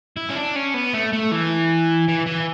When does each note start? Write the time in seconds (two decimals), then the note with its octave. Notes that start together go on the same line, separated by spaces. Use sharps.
0.17 E4
0.29 C#4
0.36 D4
0.56 C#4
0.74 B3
0.94 A3
1.13 A3
1.32 E3
2.08 E3
2.26 E3